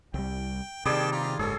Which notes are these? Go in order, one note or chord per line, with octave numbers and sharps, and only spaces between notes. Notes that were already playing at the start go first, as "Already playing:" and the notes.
C2 G3 G5
C3 D#3 G3 A#3 G#4 D5 G5 A5
F4 G4 A#5
F#1 G#2 C#4 G#4 A4